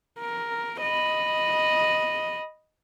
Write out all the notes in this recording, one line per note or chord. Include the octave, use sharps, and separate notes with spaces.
A#4
D#5 B5